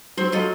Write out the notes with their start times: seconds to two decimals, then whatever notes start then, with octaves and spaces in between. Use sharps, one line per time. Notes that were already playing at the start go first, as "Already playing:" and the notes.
0.17 F#3 C4
0.32 F#3 F4 A4 D#5